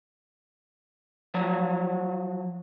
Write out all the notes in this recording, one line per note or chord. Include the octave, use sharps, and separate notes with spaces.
F3 F#3 A#5